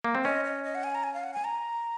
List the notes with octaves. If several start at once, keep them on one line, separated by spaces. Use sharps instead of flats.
A#3
C4
C#4 D#5
D#5
D#5
F#5
G#5
A#5
G#5
F5
F#5
G#5
A#5